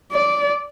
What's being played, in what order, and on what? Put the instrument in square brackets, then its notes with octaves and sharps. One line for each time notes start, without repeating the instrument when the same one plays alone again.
[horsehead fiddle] D5